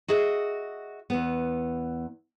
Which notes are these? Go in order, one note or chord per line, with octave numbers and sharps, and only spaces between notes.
F#4 G#4 D#5 E5
E2 B3